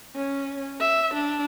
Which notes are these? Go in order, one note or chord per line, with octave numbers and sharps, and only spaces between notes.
C#4
E5
D4